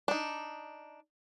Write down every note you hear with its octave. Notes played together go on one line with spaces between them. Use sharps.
D4 D#4